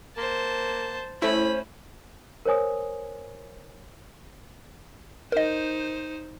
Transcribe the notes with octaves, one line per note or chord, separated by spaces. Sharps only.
A#3 C5 A5
A3 C#4 E4 C5 B5
A#4 C5 C#5 G#5 D#6
D#4 A#4 C5 D#5